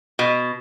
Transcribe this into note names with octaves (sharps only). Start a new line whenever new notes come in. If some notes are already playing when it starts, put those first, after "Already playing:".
B2